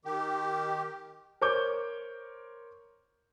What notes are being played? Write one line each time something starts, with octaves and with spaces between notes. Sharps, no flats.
D#3 G4
A#4 C5 C#5 C#6 D6 G6